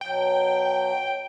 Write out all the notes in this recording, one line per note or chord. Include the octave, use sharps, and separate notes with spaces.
B2 F#3 G5